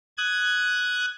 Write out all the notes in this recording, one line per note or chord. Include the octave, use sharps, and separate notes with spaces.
D#6 F#6 G#6